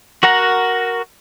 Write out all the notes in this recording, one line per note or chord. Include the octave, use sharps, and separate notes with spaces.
F#4 A#4 F#5 A#5